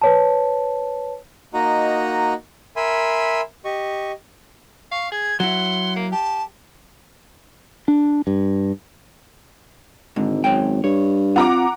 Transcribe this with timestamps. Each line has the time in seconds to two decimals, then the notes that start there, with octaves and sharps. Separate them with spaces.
0.02 B4 C#5 A5
1.54 A#3 D#4 F#4 D#5 A#5
2.76 A#4 E5 G#5 B5 C6
3.65 G4 D#5 C#6
4.92 F5 C#6
5.12 G#4 G#6
5.40 F#3 E4 F#5 C6
5.96 A#3
6.12 G4 A5
7.88 D4
8.27 G2
10.16 G#1 G#2 D3
10.44 F#2 C#5 G5
10.84 G2 C#5
11.36 C4 F4 F#5 A#5 D6